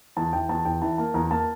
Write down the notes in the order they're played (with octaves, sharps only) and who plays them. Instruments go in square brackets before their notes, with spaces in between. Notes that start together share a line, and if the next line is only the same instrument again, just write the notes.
[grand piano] E2 [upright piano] A5
[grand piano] E3 [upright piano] G5
[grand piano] E2 [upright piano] A5
[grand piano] E2 [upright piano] G5
[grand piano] E3 [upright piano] A5
[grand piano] A#3 [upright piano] A5
[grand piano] E2 [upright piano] A#5
[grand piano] A#3 [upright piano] A5